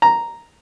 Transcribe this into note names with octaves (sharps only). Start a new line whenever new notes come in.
A#5